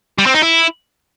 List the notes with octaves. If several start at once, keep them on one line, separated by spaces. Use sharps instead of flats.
G3
C4
D#4
E4